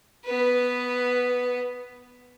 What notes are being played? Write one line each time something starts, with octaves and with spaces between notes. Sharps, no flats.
B3 B4